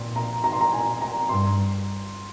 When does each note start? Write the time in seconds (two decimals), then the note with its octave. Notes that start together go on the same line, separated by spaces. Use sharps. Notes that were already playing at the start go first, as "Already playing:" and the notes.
Already playing: A#2 C6
0.16 A#5
0.44 A#5
0.52 C6
0.61 A#5
0.73 G#5
1.01 A#5
1.29 G2 C6